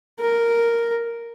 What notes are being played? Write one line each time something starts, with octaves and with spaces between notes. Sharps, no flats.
A#4